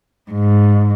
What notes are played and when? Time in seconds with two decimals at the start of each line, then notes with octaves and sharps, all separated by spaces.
0.31 G#2